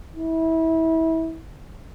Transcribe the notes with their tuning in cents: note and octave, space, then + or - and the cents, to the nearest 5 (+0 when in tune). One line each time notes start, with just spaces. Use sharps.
E4 -25